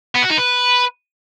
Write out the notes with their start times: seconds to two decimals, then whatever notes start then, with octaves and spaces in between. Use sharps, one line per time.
0.16 B3
0.23 F#4
0.31 D#4
0.38 B4